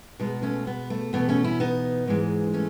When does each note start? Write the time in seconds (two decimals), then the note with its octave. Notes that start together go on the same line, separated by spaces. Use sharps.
0.20 B2 G#3 B3 D#4
0.42 A3 C#4
0.67 B3
0.90 A3
1.13 E2 B2 A3 B3
1.29 A3 C#4
1.44 C#4 E4
1.60 B3 D#4
2.07 G#2 E3 G#3
2.54 A3 C#4